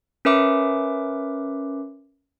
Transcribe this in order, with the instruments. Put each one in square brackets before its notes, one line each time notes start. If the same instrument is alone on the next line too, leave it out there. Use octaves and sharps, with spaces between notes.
[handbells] C#4 A#4 B4 E5 D6